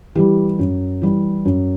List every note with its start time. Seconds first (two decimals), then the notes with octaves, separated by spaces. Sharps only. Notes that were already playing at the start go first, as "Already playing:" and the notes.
0.15 E3 G3 G4
0.59 F#2
1.02 E3 G3
1.45 F#2